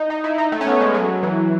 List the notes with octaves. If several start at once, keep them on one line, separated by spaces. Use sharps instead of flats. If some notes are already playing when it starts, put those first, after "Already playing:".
Already playing: D#4
D#4
E4
D#4
A3
C#4
B3
G#3
F#3
E3